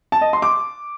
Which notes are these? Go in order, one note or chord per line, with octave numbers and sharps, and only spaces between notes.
A5
D#5
C6
D6